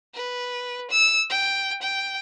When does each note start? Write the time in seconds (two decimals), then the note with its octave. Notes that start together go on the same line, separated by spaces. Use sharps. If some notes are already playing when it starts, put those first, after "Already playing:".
0.15 B4
0.91 E6
1.30 G5
1.82 G5